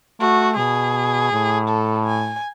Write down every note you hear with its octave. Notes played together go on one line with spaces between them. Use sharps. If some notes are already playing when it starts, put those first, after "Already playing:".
A3 F#4
B2 G#4
A2
A4
G#5